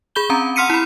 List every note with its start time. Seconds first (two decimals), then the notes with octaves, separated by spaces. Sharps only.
0.15 G#4 B5 G6 G7
0.30 C4 C#4 A#5
0.56 F#5 C6 F6 B6 C#7 D#7
0.70 E4 B5